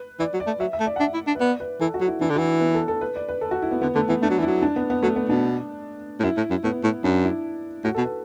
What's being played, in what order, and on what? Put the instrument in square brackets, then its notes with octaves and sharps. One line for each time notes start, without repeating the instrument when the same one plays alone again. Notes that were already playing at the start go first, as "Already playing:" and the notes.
Already playing: [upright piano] B4
[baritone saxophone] E3 [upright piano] D5
[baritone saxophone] F#3
[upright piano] D5
[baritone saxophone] A3
[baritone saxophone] F#3 [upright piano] E5
[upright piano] E5
[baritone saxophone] A3
[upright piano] D5
F#5
[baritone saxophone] D4 [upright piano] E5
[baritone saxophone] E4
D4
[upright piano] B4
[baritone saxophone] B3 [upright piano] D5
[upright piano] B4
[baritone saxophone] E3 [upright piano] A4
[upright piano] F#4
[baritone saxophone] F#3
[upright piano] E4
[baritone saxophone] E3 [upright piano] D4
[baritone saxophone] D3
[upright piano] F#4
[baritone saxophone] E3 [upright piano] E4
[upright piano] B3
A4
A4
B4
D5
B4
A4
F#4
E4
B3
[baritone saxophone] D3 [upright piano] B3
[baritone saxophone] D3 [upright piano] A3
[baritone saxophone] E3 [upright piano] B3
[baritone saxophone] A3 [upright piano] D4
[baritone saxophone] F#3
E3
[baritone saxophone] F#3 [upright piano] E4
[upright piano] D4
B3
B3
[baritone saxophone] F#3 [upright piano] A3
[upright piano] B3
[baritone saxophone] B2 [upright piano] D4
[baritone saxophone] A2
[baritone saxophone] F#2 [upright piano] E4
[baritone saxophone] A2
F#2
[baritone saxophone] A2 [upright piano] B3
[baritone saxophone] A2
[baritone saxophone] F#2 [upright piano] D4
[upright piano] E4
[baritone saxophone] A2 [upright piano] F#4
[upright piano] A4
[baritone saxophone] B2
[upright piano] B4